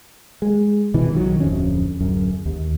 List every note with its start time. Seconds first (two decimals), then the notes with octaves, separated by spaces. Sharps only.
0.42 G#3
0.94 B2 D#3 E3
1.12 B1 D#3 F3 F#3
1.40 D1 F2 C#4
2.00 D1 F#2
2.46 D#2